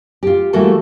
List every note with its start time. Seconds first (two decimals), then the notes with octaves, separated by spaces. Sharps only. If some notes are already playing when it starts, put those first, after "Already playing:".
0.23 F4 G4
0.53 E3 G3 A3 A#3 F#4 A4